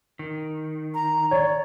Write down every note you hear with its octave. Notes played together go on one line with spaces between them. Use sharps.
D#3
A#5
C#5 D5